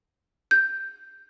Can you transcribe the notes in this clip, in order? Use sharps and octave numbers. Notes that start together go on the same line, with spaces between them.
G6